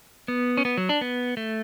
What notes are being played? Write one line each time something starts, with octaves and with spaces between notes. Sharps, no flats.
B3
C#4
B3
F#3
D4
B3
A3